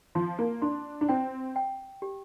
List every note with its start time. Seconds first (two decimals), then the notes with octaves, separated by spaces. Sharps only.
0.15 F3 C6
0.38 A#3
0.62 D4 C6
1.01 D4
1.09 C4 G5
1.56 G5
2.02 G4